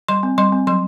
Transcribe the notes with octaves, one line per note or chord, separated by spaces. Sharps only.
G3 C6
C4
G3 C6
C4
F#3 C6